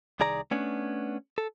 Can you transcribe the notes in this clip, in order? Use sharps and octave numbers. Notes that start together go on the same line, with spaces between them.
C2 D#3 G#4 D5 A#5
A3 B3 C#4 D4
A4